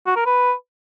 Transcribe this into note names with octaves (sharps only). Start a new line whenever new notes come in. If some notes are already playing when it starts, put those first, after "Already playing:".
F#4
A#4
B4